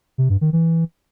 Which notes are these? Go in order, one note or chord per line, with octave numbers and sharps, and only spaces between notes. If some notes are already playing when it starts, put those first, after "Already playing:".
C3
G2
D#3
E3